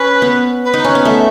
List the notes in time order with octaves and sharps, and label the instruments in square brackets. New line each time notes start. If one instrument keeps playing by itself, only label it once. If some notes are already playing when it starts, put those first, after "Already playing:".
Already playing: [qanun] C#4 [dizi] B4
[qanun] B3
[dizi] B4
[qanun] D#4
C#4
B3
[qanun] A3 [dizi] E5